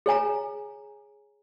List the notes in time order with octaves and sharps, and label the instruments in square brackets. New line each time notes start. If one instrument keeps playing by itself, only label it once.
[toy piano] G#4 C#5 G#5 A#5